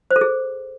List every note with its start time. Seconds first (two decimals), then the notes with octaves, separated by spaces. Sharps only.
0.11 C5
0.16 A4
0.21 G#4